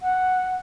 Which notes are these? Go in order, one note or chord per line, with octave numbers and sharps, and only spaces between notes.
F#5